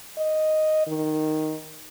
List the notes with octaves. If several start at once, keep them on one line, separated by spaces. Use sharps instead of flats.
D#5
D#3